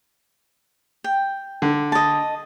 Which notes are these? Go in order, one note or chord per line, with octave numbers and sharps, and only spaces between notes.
G5
D3
D#5 A5